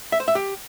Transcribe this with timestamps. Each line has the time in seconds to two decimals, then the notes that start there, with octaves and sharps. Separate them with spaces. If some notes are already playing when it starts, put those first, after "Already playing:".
0.12 E5
0.20 C5
0.28 E5
0.35 G4